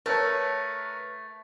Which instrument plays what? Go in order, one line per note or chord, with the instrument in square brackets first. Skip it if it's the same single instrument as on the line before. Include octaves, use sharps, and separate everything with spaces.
[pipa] A3 [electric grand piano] A#4 B4 C#5